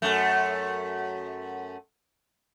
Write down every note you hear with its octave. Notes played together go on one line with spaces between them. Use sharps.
F#2 A3